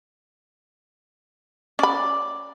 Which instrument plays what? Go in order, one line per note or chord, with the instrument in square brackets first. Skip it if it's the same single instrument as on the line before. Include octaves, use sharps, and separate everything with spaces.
[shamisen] C#4 B5 [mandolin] D5